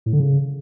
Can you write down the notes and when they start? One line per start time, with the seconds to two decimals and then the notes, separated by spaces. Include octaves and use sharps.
0.06 A2
0.13 D3
0.20 C#3